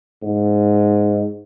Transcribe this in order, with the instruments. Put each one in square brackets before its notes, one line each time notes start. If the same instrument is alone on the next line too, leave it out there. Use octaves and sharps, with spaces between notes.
[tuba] G#2